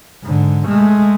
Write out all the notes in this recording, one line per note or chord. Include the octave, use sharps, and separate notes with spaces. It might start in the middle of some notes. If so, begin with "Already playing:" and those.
G#2 D3
G#3 A3